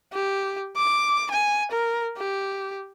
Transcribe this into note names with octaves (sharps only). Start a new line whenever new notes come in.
G4
D6
G#5
A#4
G4